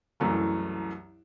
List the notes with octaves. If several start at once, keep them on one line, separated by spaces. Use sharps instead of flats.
C2 F#2 E3 A3